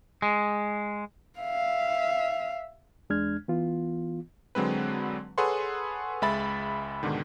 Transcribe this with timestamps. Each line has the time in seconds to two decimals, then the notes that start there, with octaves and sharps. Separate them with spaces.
0.22 G#3
1.39 E5 F5
3.10 E2 G#3 D4 F6 G#6
3.48 E3 B3 F4
4.55 D3 F#3 G#3 C4 B4
5.38 G#4 A4 B4 C#5 F#5 C6
6.22 C#2 G#3 E5 B5 A6
7.03 G#2 B2 D3 D#3